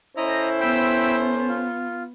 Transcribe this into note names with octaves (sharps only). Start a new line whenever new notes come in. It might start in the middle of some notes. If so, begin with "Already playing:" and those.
C#4 E4 A4 C5 D#5 A#5
B3 G5 B5 E6
F4